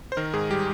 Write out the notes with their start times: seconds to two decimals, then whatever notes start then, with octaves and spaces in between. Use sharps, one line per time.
0.12 C5
0.17 D#3 A#4
0.34 G#2 G#4
0.51 G3 G4